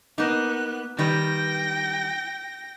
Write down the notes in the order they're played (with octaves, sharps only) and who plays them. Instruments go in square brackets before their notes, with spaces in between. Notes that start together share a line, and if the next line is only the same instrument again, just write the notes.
[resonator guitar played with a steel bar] A#3 D#4 [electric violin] B3 F#6
[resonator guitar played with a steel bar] D#3 G3 B4 [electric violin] G5 A#6